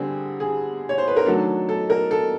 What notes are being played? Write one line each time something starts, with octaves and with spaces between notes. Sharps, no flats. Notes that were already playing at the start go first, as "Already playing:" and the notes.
Already playing: D3 G3 C4 G#4
G#4
C#5
C5
B4
A#4
D#3 F#3 A3 D4 A4
A4
A#4
A4